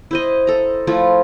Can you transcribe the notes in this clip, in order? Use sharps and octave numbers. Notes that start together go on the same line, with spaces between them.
E4 C5 D#5
A4 A#5
F3 A3 E4 F4